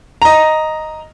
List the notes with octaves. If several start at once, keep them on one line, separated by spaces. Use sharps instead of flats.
D#5 A#5